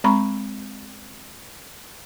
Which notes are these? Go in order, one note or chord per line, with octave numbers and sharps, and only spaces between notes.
G#3 C4 A#5 B5 C#6